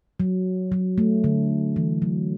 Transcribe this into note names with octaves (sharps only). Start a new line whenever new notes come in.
F#3
F#3
A3
D3
E3
F#3